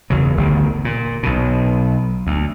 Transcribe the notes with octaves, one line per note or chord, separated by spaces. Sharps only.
F#1 E2 C#3 F#3
G1 D2 D#3
A#2
B1 B2
D2